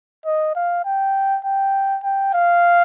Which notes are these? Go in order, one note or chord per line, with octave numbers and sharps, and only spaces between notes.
D#5
F5
G5
G5
G5
F5